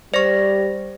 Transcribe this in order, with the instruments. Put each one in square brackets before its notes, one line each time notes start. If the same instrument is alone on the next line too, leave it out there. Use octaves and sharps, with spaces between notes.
[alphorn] G3 [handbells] C5 C#6 [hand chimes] D5 A#6